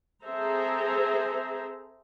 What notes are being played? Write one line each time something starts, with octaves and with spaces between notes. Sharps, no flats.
C4 G#4 A4 C5 E5 A#5